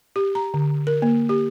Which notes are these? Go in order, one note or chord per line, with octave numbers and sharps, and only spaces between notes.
G4
A#5
D3
A#4
A#3
G4